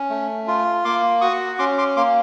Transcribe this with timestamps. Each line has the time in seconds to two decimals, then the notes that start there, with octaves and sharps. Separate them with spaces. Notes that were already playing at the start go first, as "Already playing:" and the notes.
Already playing: C#4
0.10 A3
0.48 F4
0.85 A#3 C6 D6
1.21 F#4 C#6 D#6
1.59 C#4 C6 D6
1.78 C6 D6
1.96 A#3 C6 D6